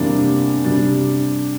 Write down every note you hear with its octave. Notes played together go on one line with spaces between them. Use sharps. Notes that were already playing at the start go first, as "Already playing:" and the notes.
Already playing: E2 C3 G3 A#3 D4
C3 G3 D4